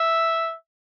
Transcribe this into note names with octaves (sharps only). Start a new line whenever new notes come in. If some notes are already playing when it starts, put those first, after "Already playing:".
Already playing: E5